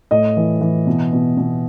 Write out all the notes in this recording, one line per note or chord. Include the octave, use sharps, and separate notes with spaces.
A2 D#5
E3
E3
B2
B2
B2